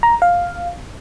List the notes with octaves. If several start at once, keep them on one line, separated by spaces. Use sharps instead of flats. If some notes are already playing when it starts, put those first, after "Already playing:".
A#5
F5